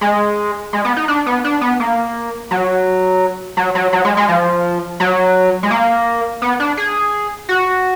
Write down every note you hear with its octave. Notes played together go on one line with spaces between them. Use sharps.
G#3
G#3
B3
D#4
D4
B3
D4
B3
A#3
F#3
F#3
F#3
F#3
G#3
G#3
F3
F#3
G#3
A#3
B3
D4
G#4
F#4